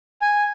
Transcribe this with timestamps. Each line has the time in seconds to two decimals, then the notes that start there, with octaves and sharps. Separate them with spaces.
0.22 G#5